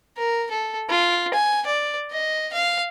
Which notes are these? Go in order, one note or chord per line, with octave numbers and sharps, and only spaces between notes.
A#4
A4
F4
G#5
D5
D#5
F5